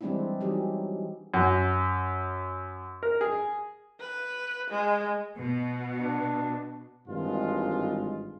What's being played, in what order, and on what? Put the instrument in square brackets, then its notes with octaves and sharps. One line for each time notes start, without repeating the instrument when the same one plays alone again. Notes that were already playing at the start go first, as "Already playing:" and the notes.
[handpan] E3 G3 G#3 C4 D4 E4
E3 F#3 G3 D#4 G4 G#4
[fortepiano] F#2
A#4
G#4
[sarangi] B4
G#3
[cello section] B2
[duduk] D4
[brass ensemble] G#1 G2 E3 G#3 F4